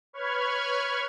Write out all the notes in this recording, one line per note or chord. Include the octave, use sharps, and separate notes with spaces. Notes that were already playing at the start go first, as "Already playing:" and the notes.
B4 C#5 B5 C#6 F6 G#6